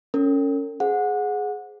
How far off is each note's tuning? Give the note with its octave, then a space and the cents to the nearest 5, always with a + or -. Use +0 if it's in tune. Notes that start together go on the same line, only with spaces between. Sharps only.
C#4 +0 A#4 -45
G#4 +10 C5 -10 F#5 -25